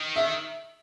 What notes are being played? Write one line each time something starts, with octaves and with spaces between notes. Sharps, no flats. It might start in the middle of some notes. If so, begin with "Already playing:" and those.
Already playing: D#3
E5